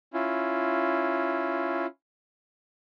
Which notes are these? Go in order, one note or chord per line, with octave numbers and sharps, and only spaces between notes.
C#4 E4 F4